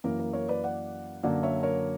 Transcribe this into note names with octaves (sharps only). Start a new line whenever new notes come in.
F#2 E3 A#3 A#4
A#4
A#4 C#5
B4 D5
D5 F#5
F#2 D3 F#3 A#3 D5 F#5
C#5 E5
A#4 C#5